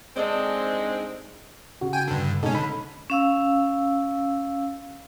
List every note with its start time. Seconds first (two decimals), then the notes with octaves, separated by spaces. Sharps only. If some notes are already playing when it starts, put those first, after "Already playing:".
0.16 G#3 C4 D4 D#4 A4
1.81 C#3 F#4
1.93 G5 G#5
2.08 G2 D3
2.43 B2 G#3 C#4 D#4 A4
2.55 D3 B5
3.10 C#4 F5 E6